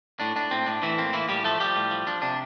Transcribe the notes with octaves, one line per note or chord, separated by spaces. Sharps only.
A2 D4
A2 D4
A2 C4
A2 D4
A2 E3 E4
A#3 C4
E3 A#3 E4
A2 G3 G4
F3 A3 A4
F3 G3 G4
A2
F3
F3 D4
C3 D4